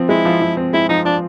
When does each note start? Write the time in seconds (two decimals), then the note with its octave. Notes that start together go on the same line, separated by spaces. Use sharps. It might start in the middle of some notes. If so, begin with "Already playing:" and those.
Already playing: F3 C4
0.09 G#3 E4
0.25 F3
0.42 F3
0.57 C4
0.73 G#3 E4
0.89 F3 D#4
1.05 F3 D4